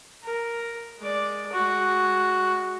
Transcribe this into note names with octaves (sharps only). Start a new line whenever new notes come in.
A#4
G#3 D5
G#3 F#4